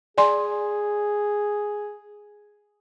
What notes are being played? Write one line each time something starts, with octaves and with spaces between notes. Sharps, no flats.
G#4 D5 G#5 C6